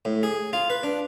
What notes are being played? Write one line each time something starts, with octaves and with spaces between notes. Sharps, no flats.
A2
G#4
F4
B4
D4